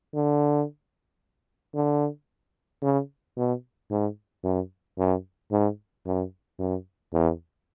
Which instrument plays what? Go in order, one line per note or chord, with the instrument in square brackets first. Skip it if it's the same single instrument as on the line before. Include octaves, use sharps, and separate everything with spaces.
[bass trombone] D3
D3
C#3
B2
G#2
F#2
F#2
G#2
F#2
F#2
E2